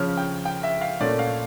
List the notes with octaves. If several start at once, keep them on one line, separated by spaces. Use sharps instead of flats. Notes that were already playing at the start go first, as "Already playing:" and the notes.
Already playing: C#3 F3 C#4 F6
G5
G5
E5
F5
A#2 A3 C#4 D5
F5